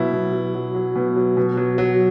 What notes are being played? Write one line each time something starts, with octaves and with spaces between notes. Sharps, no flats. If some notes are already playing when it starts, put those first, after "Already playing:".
Already playing: B2 F#3 E4
B2
F#3
F#3
F#3
B2
F#3
B2
F#3
F#3